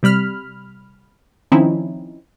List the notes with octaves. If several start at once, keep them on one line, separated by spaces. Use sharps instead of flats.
C3 G3 B5 F6
D#3 F3 C4 C#4 D#4 E4